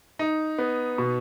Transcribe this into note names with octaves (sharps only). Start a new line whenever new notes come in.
D#4
B3
B2